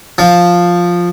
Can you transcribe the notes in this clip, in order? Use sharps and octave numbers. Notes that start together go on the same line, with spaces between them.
F3